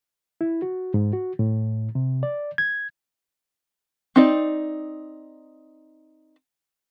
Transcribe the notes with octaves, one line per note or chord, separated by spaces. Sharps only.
E4
F#4
G#2
F#4
A2
C3
D5
G#6
C4 D#4 D5